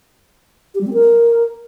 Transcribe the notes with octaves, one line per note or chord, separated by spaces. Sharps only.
G4
G3
C4
A#4